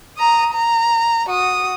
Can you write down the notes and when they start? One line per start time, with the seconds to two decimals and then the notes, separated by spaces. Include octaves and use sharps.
0.17 A#5 D#6
0.53 A#5
1.29 F#4 D#6